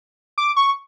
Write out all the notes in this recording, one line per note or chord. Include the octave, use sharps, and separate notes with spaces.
D6
C#6